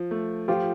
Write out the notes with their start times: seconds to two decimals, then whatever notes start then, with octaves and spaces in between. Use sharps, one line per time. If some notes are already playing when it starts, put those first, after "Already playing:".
Already playing: F3
0.11 A3
0.48 F3 F4 G4